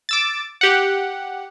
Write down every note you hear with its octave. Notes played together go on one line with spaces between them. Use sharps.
D6 E6 A6
G4 F#5